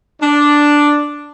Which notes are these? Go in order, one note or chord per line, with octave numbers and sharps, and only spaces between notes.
D4